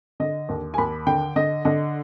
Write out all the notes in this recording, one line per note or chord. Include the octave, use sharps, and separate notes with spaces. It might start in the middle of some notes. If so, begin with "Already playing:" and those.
D3 D#5
D#2
G#5
D#2 B5
D3 G5
D3 D#5
D3 D#5